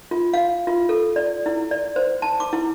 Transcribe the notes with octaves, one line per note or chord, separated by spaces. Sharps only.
F4
F5
F4
A4
D5
E4
D5
C5
A5
D6
E4